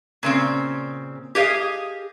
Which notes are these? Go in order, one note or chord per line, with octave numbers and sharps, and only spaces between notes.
A#2 C#3 C4
G4 G#4 D#5 F5